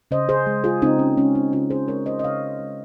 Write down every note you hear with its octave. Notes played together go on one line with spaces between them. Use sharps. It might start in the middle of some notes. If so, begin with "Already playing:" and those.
C#3 C5 D#5
G#4 C5
G#3
F4 G#4
C#3 C4 D#4
C#4
G#3 C#4
C4 D#4
C#3 C#4 F4
G#4 C5
G#3 A#4 C#5
C5 D#5
D#5
C#3 C#5 F5
G#3